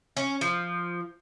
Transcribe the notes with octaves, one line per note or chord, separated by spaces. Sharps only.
C#4
F3